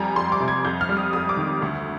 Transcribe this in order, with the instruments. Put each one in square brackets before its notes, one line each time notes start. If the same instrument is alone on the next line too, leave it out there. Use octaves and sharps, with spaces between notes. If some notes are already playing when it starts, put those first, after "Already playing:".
Already playing: [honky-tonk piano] F2 G3 G#5 A#5
F2 C6
D6
C3
G#6
F2 G6
F6
G3
D#6
F2 D#6
D6
D#3
D2